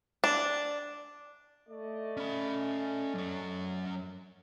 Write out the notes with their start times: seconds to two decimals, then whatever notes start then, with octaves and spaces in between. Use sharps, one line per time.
0.24 D4
1.69 A3 D5 D#5
2.17 C#4 B5
3.15 F#2 C#5